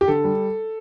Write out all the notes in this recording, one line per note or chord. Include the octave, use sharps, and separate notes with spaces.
G4
D3 A4
G3